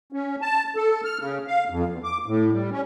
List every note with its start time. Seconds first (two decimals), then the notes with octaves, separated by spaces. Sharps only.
0.12 C#4
0.42 A5
0.76 A4
1.04 F6
1.19 C#3
1.47 F5
1.70 F2
1.90 E2
2.04 D6
2.26 A2
2.52 G3
2.71 C#4